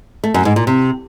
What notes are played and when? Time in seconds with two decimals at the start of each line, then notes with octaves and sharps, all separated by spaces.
0.24 A3
0.34 F#2
0.45 G#2
0.56 A#2
0.67 C3